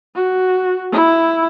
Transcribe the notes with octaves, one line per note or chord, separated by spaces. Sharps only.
F#4
E4